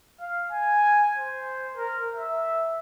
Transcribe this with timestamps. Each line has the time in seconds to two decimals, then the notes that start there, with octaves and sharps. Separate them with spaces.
0.21 F5
0.52 G#5
1.18 C5
1.76 A#4
2.16 E5